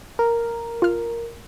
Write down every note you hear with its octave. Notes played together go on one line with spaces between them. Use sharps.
A#4
F4 F6